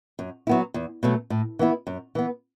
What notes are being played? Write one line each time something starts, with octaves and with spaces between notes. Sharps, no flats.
F#2
F#3 B3 E4
E2
B2 F#3 A3
A2
E3 B3 E4
F#2
E3 B3